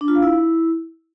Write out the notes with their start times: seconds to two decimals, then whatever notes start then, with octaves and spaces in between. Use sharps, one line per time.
0.01 D4
0.08 F4
0.15 F5
0.22 E4